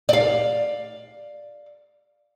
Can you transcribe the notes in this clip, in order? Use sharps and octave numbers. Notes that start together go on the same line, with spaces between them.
D5 F5